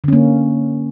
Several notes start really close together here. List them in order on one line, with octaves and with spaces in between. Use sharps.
D3 C#4 A#3